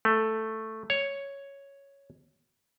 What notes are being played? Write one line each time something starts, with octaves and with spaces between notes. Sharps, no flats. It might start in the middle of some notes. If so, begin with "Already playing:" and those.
A3
C#5